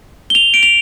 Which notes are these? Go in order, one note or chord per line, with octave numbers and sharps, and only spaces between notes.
G7
F7
D7
F7